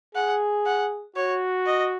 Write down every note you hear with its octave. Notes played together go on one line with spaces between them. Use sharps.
G#4 F#5
F#5
F#4 C#5
D#5